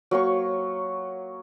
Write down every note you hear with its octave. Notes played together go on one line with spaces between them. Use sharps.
F#3 A#3 C#5 C#6